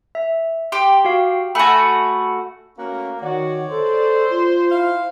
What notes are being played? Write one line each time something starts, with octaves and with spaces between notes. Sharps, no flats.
E5
G4 C6
F#4 F5
A3 F#4 G#5 A5 B5
A3 A#3 C#4 F#4
D#3 F#4 C#5 D5
A4 C5
F4
E4 F5